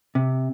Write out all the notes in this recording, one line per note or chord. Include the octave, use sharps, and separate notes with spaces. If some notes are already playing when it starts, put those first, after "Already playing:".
C3